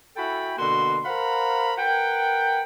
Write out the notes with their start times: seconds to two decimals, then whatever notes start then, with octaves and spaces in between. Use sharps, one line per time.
0.17 E4 F#4 A4 G5 G#5 B5
0.58 B2 D3 A#3 F#4 C6
1.05 A#4 C5 F5 F#5 A#5 B5
1.78 A#4 B4 F#5 G5